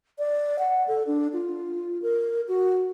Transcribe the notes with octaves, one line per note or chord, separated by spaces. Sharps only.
D5
F#5
A4
D4
F4
A#4
F#4